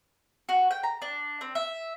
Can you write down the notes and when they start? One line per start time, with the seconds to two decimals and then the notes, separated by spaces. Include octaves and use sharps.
0.49 F#4
0.71 G5
0.83 A#5
1.02 D4
1.41 C4
1.55 E5